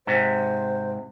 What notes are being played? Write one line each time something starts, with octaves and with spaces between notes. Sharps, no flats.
G#2 C3 C5